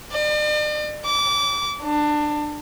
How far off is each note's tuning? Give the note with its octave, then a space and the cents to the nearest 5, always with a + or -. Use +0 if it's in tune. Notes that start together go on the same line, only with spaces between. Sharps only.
D5 +45
D6 -25
D4 +20